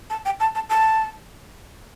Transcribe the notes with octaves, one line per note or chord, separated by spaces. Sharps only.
A5
G5
A5
A5
A5